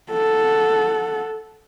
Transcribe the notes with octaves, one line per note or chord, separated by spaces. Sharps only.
A4 F#5